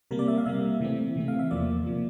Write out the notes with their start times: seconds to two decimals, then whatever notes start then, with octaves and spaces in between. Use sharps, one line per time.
0.11 C3 G3 A#3 A#4
0.19 D5
0.28 E5
0.38 F5
0.46 C3 G3 A#3 E5
0.80 C3 E3 A3 C4
1.16 C3 E3 A3 C4
1.28 F5
1.39 E5
1.51 E2 C3 F3 A#3 D5
1.86 C3 F3 A#3